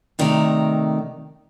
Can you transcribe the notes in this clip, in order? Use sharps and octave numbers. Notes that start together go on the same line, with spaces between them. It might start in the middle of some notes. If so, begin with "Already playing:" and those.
C3 D#3 A3 D5 A#5